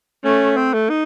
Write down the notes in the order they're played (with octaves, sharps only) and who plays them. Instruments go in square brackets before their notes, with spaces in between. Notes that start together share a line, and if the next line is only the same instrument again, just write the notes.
[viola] A3 [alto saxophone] C#4
[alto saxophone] C4
A3
D#4